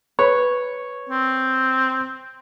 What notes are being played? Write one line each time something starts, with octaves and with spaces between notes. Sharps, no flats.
B4 C#5
C4